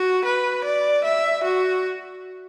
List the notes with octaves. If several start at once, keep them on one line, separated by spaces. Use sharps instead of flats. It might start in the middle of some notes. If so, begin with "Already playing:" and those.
Already playing: F#4
B4
D5
E5
F#4